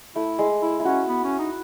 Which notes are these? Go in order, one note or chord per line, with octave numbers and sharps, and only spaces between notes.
A3 E4
G#3
E4
E4
C#4 F#4
B3
C#4
D#4